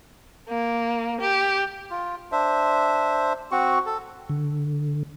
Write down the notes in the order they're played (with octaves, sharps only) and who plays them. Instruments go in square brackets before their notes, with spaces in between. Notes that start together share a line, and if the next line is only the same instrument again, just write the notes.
[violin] A#3
G4
[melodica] F4
D4 C5 E5
C4 F#4 C#6
A4
[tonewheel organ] D3